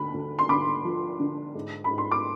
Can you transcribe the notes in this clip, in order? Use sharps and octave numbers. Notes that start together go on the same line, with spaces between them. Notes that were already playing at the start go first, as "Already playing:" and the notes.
Already playing: D2 B5
D2
C6
D3 B5 D6
F3
D3
G#2
B5
G#2
C6
D6